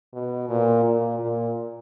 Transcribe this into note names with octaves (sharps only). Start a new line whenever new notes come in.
B2
A#2
A#2
A#2